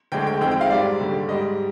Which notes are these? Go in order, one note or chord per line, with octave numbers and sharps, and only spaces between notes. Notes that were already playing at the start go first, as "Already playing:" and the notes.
D2 D3 G#3 G5
G5
F2 D#3 G#3 G5
G5
F5
G#2 G3 D5
D#2 D3 G3
G#2 G3 D#5